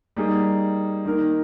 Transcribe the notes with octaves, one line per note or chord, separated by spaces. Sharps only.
G3 A#3 D#4 G#4
D#3 A#3 D#4 A#4